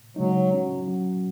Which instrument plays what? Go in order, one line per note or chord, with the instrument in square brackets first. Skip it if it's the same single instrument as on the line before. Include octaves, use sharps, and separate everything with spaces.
[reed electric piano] C#3 G#3 D#4 [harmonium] F#3
[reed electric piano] F#3 C#4 F#4
F#3 C#4 F#4